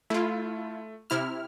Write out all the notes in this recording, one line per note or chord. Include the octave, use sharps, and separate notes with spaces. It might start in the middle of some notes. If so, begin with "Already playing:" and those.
A3 E4 F4
C3 E4 F6